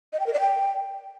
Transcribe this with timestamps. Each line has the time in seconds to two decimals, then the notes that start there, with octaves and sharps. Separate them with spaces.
0.13 D#5
0.20 G5
0.27 A#4
0.33 D5
0.40 G5